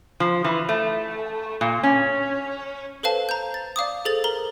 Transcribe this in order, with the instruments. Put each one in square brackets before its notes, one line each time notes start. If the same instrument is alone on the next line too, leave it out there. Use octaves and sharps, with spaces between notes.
[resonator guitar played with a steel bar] F3
E3
A3
A#2
C#4
[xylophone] A4 B4 C5 F5 A5
A#5 G6
A6
D5 F5 D6 D#6
G#4 A4 C5 A6 F7
A#4 A#5 F#7 G7